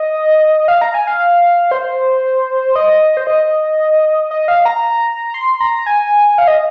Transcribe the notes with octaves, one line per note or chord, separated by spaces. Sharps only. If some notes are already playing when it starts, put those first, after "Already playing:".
Already playing: D#5
F5
A#5
G#5
F5
C5
D#5
C5
D#5
D#5
F5
A#5
C6
A#5
G#5
F5
D#5